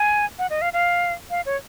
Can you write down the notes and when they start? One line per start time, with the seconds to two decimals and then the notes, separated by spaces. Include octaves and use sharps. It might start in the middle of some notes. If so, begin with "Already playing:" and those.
Already playing: G#5
0.39 F#5
0.50 D#5
0.62 F5
0.73 F5
1.30 F5
1.46 C#5